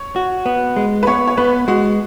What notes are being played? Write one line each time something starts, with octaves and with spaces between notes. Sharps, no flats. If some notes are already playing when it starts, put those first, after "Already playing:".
Already playing: C#5
F#4
B3
G#3
B4
B3 C#5
C#5
B3 B4
G#3 F#4